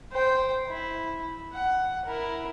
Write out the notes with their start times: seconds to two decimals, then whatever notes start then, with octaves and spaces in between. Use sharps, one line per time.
0.12 C5 G5
0.69 E4
1.53 F#5
2.06 E4 A#4